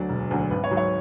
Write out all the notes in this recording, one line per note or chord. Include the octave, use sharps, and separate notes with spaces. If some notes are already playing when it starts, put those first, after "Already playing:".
Already playing: D2 D3 F#3 D5
E1
D2 D3 F#3
G#1 B4
C#5
G#2 F#3
C#5